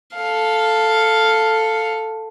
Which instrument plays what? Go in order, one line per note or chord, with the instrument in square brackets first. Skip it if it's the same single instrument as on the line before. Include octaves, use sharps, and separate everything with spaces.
[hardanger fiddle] A4 F5